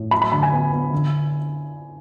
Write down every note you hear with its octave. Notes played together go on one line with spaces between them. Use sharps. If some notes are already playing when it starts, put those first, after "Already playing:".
Already playing: A2
F#3 B5
B5
D3 B5
G#5
B3
B3
D3